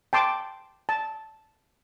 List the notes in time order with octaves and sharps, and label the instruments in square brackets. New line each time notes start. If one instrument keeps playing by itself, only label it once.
[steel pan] G5 A5 C6 D6
A5